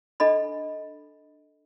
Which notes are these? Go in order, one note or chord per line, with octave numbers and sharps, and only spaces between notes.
D4 A4 D#5 B5